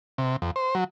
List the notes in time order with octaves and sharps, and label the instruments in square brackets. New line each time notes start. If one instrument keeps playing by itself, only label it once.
[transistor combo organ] C3
F2
C5
F#3